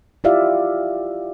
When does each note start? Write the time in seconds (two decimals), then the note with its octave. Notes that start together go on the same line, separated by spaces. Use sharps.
0.24 E4 F4 G4 D5 E5 F5